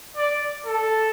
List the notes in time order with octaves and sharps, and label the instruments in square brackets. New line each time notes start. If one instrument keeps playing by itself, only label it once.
[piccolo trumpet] D5
A4